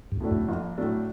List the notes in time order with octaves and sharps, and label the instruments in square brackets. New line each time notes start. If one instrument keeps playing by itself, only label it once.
[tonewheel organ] G2
[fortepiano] A2 F#3 A3 D4
[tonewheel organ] F#2
[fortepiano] A#1
A2 F#3 A3 D4